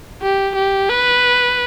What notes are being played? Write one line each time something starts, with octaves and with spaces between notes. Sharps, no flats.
G4
G4
B4